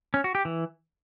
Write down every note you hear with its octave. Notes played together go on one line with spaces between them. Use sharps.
C#4
F#4
G4
E3